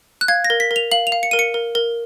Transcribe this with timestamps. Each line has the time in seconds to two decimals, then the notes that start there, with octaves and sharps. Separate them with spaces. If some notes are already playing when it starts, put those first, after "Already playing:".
0.21 F#6
0.28 F5 G#6
0.45 A#6
0.50 A#4
0.60 B6
0.71 A#4
0.76 F7
0.92 F5 F#7
1.07 F7
1.12 F5
1.23 C#7
1.31 A#4 D#7
1.39 C#7
1.54 A#4
1.75 A#4